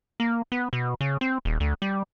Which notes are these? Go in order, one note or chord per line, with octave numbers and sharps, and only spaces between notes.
A#3
B3
B2
C#3
C4
D#1
D2
G3